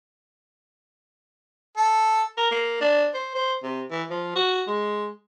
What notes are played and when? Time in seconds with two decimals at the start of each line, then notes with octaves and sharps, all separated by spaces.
1.77 A4
2.38 A#4
2.51 A#3
2.81 D4
3.15 C5
3.35 C5
3.63 C3
3.91 E3
4.11 F3
4.36 F#4
4.67 G#3